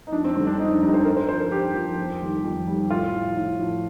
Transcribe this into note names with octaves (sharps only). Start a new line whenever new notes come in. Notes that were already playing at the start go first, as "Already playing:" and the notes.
D#4
F2 D4
C4
D3 G3 C4
D4
F2 D#4
D4
D3 G3 D#4
C5
G2 A#4
C5
F3 C5
A#4
G2 G4
F3
F2
D#3 G3
F2
D#3 G3
A2 F4
F3
A2
F3